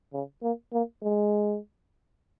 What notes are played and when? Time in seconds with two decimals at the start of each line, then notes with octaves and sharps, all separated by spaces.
0.13 C#3
0.42 A#3
0.73 A#3
1.03 G#3